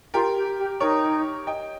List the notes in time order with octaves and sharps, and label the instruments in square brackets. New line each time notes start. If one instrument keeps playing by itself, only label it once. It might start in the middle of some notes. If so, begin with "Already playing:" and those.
[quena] F4 [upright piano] G4 A#4
[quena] G4
G4
[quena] D#4 [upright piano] A#4 C#5
[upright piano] D#5 G5